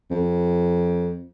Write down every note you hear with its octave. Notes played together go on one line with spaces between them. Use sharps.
F2